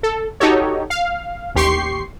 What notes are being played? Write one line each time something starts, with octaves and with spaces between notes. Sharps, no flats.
A4
D#4 F#4 G4 A4 C#5
F5
A1 D#2 G4 C6 C#6 C7